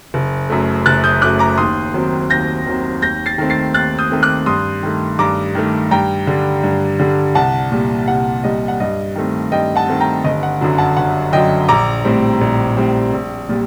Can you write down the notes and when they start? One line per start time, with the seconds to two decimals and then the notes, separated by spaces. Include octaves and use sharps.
0.14 F#1
0.50 F#2 F#3 A3
0.86 F#1 F#6 A6
1.04 D#6 G6
1.22 F#2 F#3 A3 D6 F#6
1.39 A#5 D6
1.58 D#2 C6 D#6
1.94 D#3 F#3 C4
2.30 D#2 G6 A#6
2.66 D#3 F#3 C4
3.02 D#2 G6 A#6
3.26 A6 C7
3.38 D#3 A3 C4
3.50 A6 C7
3.74 D#2 F#6 A6
3.99 D#6 G6
4.10 D#3 A3 C4
4.23 D6 F#6
4.46 G2 C6 D#6
4.83 D#3 A3
5.19 G2 A#5 D6
5.55 D#3 A3
5.91 G2 G5 A#5
6.27 D3 G3
6.64 G2
6.99 D3 G3
7.35 C2 F#5 A5
7.72 A#2 G3
8.07 C2 F#5
8.44 A#2 G3 D#5
8.68 F#5
8.80 G2 D#5
9.15 D#3 A3 C4
9.52 G2 D#5 G5
9.76 F#5 A5
9.88 D#3 A3 C4
10.00 G5 A#5
10.25 G1 D#5
10.43 F#5
10.61 F#2 D3 F#3
10.78 F#5 A5
10.97 G1 F#5
11.32 F#2 D3 F#3 D#5 G5
11.68 A#1 A#5 D6
12.05 A2 G3 C4
12.41 A#1
12.77 A2 G3 C4
13.13 A#1
13.49 A#2 G3